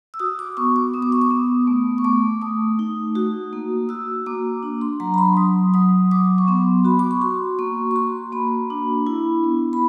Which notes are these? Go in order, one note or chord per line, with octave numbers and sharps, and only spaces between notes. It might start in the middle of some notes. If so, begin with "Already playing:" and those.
E6
F#4 D#6
D6
B3 C#6
D6
B3 D#6
D6
C#6
D6
B3 D#6
A3
C#6
A3 D6
A3 D#6
D#4
F#4
A#3
F#4 E6
A#3 D6
D4
C6
F#3 A#5
B5
C6
F#3 D#6
F#3 D#6
F#3 D6
C#6
B3 C6
F#4 B5
D6
C#6
F#4 C6
A#3 C#6
C#6
F#4 C6
A#3 B5
D4
E4
B3
B5